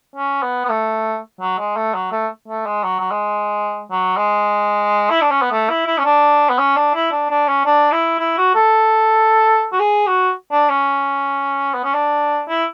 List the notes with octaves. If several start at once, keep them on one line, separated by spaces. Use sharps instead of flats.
C#4
B3
B3
A3
F#3
G#3
A3
F#3
A3
A3
G#3
F#3
F#3
G#3
F#3
G#3
E4
D4
C#4
B3
A3
E4
E4
C#4
D4
B3
C#4
D4
E4
D4
D4
C#4
D4
E4
E4
F#4
A4
F#4
G#4
F#4
D4
C#4
B3
C#4
D4
E4